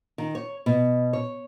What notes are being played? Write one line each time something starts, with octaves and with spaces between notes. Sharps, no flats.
D#3
C#5
B2
C#5